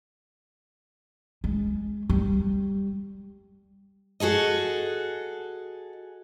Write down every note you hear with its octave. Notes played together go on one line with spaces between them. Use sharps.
G#3
G3
F#4 G#4 A4 D#5